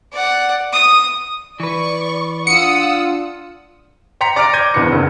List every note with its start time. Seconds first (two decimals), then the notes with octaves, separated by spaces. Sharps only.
0.13 D5 F#5
0.73 D#6
1.60 E3 B4 D5 C#6
2.47 D4 F4 F#5 D#6 E6 C#7
4.21 G5 A#5 C6 B6 C#7 F7
4.36 D5 A#5 D6 F6 A#6 D7
4.53 D6 G6 G#6 A#6 D#7
4.74 G#1 E2 D4 B4 D6 C#7
4.92 F#1